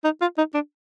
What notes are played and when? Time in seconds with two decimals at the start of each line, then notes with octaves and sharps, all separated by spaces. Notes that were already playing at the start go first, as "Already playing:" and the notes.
0.04 D#4
0.21 F4
0.38 D#4
0.54 D4